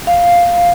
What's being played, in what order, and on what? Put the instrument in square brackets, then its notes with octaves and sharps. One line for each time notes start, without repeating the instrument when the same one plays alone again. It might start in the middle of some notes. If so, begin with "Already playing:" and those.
[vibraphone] F5